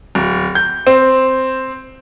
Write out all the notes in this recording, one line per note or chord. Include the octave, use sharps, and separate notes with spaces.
D1
G6
C4